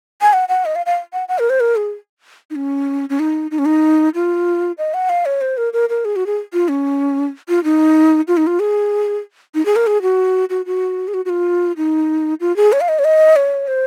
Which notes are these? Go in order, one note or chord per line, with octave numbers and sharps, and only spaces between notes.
G#5
F#5
F#5
D#5
F5
F5
F#5
F#5
A#4
C5
A#4
G#4
D#4
C#4
C#4
D#4
D#4
C#4
D#4
F4
D#5
F#5
F5
C#5
C5
A#4
A#4
A#4
G#4
F#4
G#4
F4
C#4
F4
D#4
F4
D#4
F4
G#4
D#4
G#4
A#4
G#4
F#4
F#4
F#4
G#4
F#4
F#4
F4
D#4
F4
G#4
C#5
F5
D#5
C#5
D#5
C#5
C5